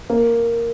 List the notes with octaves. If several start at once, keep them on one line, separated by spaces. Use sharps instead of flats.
A#3